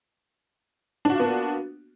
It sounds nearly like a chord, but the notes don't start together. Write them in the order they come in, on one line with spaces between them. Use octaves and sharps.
D4 F#4 F4 B3 A#3